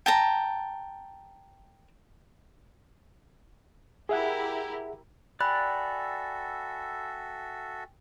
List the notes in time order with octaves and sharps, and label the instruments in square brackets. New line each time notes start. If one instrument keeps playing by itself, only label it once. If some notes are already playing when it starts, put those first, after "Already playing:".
[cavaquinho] G5 A5 A#5
[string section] E4 G4 A#4 [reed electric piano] G#4 E5 F#5
[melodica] F#4 A4 E5 [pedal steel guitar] D5 F#6 [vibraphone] G5 G#5 [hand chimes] B5